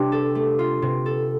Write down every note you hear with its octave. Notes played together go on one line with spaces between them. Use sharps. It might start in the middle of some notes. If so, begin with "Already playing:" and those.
Already playing: C3 D4 G4
A4
A3
F4
C3
A4